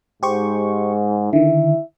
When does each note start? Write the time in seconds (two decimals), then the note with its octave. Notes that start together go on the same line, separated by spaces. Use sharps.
0.23 G#2 G4 C5 C#6
1.33 D3 D#3 E4 E5